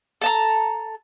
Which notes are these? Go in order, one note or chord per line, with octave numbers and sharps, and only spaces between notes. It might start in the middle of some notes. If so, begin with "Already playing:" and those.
A4 A5 A#5